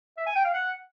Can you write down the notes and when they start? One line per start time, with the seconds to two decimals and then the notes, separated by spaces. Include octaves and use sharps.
0.17 E5
0.26 G#5
0.35 G5
0.44 F5
0.54 F#5